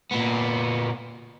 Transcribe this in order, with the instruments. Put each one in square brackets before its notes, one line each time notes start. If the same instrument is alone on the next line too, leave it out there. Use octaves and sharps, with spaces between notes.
[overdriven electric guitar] A#2 B3